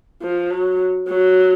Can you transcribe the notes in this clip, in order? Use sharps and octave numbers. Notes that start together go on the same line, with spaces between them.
F3
F#3
F#3